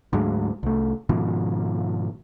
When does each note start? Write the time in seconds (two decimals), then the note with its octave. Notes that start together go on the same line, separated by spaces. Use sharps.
0.13 D2 G#2 F#3 G#3
0.63 C2 A3
1.09 G#2 B2 D#3 F3